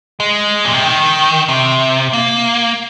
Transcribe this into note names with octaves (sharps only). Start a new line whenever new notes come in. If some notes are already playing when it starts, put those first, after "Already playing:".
G#3
A#2
C3
D#3
C3
A#3